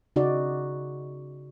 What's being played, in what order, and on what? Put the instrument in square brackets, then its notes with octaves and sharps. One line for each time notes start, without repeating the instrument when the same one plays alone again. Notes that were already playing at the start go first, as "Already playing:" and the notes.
[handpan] C#3 D#4 F#4 D5